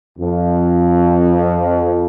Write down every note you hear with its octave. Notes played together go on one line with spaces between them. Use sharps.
F2